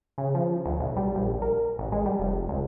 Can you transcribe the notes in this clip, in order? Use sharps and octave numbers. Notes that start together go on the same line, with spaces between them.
C#3
F3
D2
B1
G3
A#1
A#4
A1
G#3
G3
F1
C#2